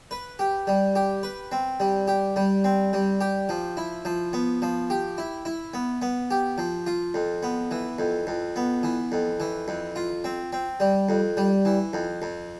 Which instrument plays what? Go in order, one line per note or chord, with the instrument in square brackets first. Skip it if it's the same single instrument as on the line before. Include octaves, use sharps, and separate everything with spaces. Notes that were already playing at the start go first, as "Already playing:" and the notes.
[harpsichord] B4
G4
G3
G4
B4
C4
G3
G4
G3
C4
G3
G4
F3
E4
F3
B3
F3
G4
E4
E4
B3
B3
G4
F3
F4
F2
B3
E3
F2
F2
B3
E3
F2
E3
F2
F4
C4
C4
G3
F2
G3
E3
F2
F2